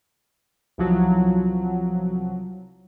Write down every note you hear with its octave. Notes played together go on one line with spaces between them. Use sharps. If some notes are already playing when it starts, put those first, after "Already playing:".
C2 F3 F#3